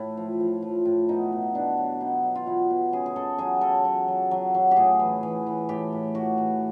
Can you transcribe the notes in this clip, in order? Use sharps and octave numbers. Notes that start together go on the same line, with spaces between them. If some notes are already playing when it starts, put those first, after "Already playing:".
Already playing: A2 E4
F3
F3
F3
A2
B2 D#4
B2
B2 D4
F#3
B2 D#4
F#3
F4
B2 E4
B2
C#3 G#4
G#4
C#3 A4
F#3 G#4
C#3 A4
F#3
F#3
F#3
F#3
G4
A2 G#4
E3
E3
E3
A2 G4
A2
A2 F#4
E3